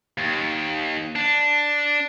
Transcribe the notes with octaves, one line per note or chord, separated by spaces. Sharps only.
D#2
D4